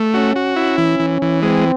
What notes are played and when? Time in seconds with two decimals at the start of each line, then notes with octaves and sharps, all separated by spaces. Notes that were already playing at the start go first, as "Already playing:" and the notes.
Already playing: A3
0.14 C#4 F#4
0.36 F#4
0.56 C#4 E4
0.78 E3
1.00 E3
1.22 E3
1.42 G#3 C4